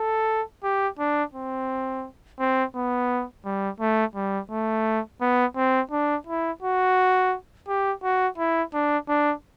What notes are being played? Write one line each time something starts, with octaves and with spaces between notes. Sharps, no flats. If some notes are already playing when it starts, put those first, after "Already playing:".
Already playing: A4
G4
D4
C4
C4
B3
G3
A3
G3
A3
B3
C4
D4
E4
F#4
G4
F#4
E4
D4
D4